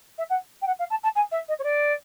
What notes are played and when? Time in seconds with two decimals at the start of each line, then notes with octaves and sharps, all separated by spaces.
0.18 E5
0.30 F#5
0.62 G5
0.67 F#5
0.79 F5
0.90 A5
1.04 A5
1.16 G#5
1.32 E5
1.49 D#5
1.59 C#5
1.64 D5